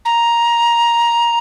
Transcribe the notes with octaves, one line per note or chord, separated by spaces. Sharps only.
A#5